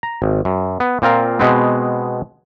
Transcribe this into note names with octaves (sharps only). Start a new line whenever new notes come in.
A#5
G#1
F#2
B3
A#2 C4 F4 A#4
B2 G#3 B3 C4